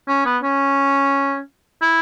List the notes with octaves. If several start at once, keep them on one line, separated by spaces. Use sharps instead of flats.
C#4
B3
C#4
E4